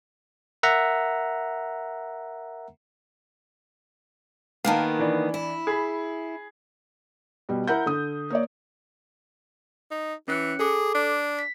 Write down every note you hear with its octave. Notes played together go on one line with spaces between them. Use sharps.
A#4 E5 F#5 A#5
D#3 A#3 B3 F5 G5 A5
E3 D4
E4
G#4 B5
B2 G3
E4 A#4 F#5 G6
D3 D#6
A#3 C#5 D5
D#4
E3 C#4 F#6 C#7
G#4 A4 D6
D4
B6